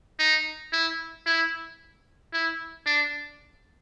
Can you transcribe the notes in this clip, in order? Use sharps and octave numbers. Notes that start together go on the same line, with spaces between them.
D#4
E4
E4
E4
D4